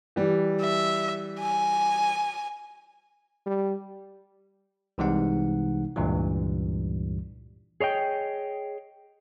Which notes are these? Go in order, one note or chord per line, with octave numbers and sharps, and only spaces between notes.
E3 G3
E5
G#5
G3
C2 C3 E3 G#3 D#4 F#5
C#2 G2 A#2 E3 G3
G#4 C#5 D#5 G5